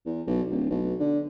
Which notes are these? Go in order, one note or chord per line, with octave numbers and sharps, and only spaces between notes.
E2
B1
D1
B1
D3